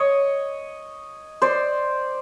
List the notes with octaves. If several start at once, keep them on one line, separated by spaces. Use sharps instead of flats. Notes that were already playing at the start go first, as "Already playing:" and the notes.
Already playing: C#5 D#5
C5 D5